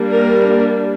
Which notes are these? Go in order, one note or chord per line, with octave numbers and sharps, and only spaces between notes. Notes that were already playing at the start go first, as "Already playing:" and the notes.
Already playing: G3 A#3 D4
A#4